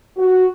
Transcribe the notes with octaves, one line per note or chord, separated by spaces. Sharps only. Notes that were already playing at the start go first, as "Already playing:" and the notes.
F#4